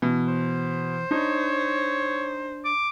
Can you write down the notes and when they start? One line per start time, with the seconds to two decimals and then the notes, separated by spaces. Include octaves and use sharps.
0.02 B2 E3
0.28 C5
1.11 D4 D#4 C#5
2.65 D6